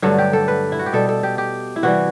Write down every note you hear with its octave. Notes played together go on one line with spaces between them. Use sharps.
G2 D3 F#3 A3 A4
G4
A4
B4
E4
F#4
G4
B2 G3 A4
A4
G4
G4
E4
C3 E3 G3 F#4